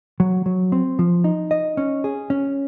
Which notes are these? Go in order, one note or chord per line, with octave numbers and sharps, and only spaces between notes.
F#3
F#3
C4
F3
D#4
D#5
C#4
G#4
C#4